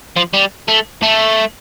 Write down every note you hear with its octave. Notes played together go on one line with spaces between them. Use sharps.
F3
G3
A3
A3